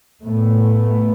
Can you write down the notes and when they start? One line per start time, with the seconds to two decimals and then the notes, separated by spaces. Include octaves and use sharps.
0.24 A2 A3 B3